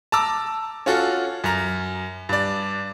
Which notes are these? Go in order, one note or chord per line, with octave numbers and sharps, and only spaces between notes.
A5 A#5 D6 E6
C#4 F4 F#4 A4
F#2 A#5
G2 D5